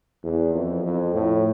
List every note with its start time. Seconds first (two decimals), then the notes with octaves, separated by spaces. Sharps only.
0.24 E2
0.54 F2
0.84 F2
1.14 A2